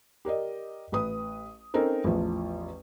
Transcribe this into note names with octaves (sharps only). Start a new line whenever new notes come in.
G4 A#4 D5 D#5
A1 B4 D#6
C4 C#4 D#4 A4 A#4 C5
A1 E2 F3